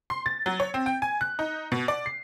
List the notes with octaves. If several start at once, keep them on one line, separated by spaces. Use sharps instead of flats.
C6
A6
F#3
C#5
C4
G5
G#5
F#6
D#4
B2
D5
C7